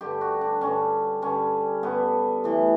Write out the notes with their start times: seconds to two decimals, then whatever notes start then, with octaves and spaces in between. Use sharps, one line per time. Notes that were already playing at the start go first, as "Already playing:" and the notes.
0.01 G2 D3 G3 G4
0.21 F#4
0.41 D4
0.61 G2 D3 G3 C#4
1.22 G2 D3 G3 C#4
1.83 G2 D3 G3 B3
2.44 A2 E3 G3